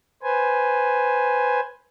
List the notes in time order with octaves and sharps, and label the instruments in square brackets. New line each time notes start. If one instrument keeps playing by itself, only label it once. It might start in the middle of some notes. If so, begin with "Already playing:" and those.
[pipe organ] B4 C5 G#5